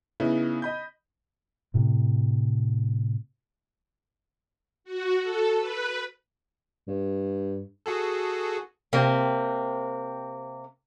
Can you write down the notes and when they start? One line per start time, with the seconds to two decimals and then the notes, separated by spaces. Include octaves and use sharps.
0.20 C#3 B3 D#4 E4
0.62 D#5 B5 G6
1.74 A2 C3
4.84 F#4
5.22 A4
5.57 B4
6.88 G2
7.86 F#4 G#4 A4
8.93 C3 A#3 C4